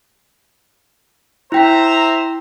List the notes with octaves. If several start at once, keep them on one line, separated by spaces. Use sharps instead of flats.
E4 C5 E5 G5 A#5 B6